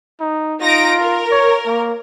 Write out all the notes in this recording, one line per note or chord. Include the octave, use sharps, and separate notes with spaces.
D#4
D#4 F4 A#6 D7
A#4
C#5
A#3